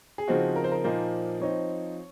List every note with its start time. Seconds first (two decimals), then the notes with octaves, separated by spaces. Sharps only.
0.18 G#4
0.28 C#3 F3 C4 D#4 F#4
0.56 A#4
0.64 C5
0.71 A#4
0.84 A#2 F3 A#3 D#4 C5
1.41 F3 C4 D#4 C#5